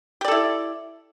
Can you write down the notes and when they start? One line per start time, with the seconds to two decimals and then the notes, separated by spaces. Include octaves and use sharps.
0.21 G4
0.25 D5
0.28 A4
0.31 E4